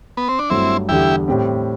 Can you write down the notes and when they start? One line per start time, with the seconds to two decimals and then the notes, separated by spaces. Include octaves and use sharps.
0.17 B3
0.29 C4
0.39 D4
0.50 G2 F#3 A3 C4 E4
0.89 E2 D3 G3 E4 G4
1.28 A2 G3 C4 G4